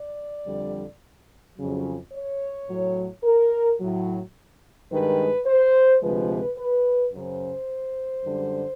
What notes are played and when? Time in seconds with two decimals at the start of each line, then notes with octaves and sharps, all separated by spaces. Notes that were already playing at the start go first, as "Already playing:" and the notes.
Already playing: D5
0.46 F2 D3 G3
1.57 F2 C#3 F#3
2.12 C#5
2.68 A2 F#3
3.23 A#4
3.79 A2 F#3
4.90 G2 D#3 G#3 B4
5.46 C5
6.02 D2 C3 F3 G#3 B4
6.57 B4
7.13 F#2 C#3 F#3 C5
8.24 F#2 D3 G3